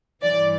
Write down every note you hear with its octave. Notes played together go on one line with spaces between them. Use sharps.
G2 E3 D5